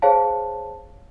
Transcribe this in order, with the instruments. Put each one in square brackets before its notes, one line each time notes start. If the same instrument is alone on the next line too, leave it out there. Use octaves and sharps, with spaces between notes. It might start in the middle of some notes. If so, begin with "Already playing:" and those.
[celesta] G#4 C5 C#5 F5 A5